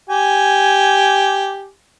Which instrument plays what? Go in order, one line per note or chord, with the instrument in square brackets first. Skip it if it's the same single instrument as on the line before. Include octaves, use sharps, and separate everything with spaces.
[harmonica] G4 G#5